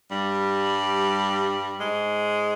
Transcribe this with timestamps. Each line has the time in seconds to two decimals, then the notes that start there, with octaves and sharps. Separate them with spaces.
0.11 G2 G3
1.80 G#2 G#3